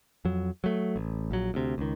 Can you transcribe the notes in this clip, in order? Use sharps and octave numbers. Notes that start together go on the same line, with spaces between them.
F2 F#3
F#3 A3
A1
A#1 F#3
D2 C3
C#2 D#3